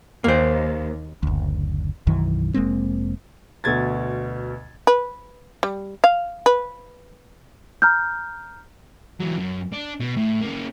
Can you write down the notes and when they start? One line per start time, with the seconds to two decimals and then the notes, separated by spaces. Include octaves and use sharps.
0.24 D#2 A#3 C5
1.23 F#1 D2
2.07 B1 F#2 D#3 E3
2.54 F1 G#3 A#3 C4
3.64 D2 B2 G#6 A6
4.87 B4
5.63 G3
6.04 F5
6.46 B4
7.82 A#5 F6 G6
9.20 E3 F#3
9.38 F#2
9.73 D4
10.00 B2
10.17 A2
10.41 A#3 C#4